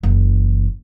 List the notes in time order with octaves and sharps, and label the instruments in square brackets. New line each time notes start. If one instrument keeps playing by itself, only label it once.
[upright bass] F#1 E3